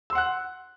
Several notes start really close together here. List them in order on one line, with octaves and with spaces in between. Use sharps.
E6 C6 F#5 F#6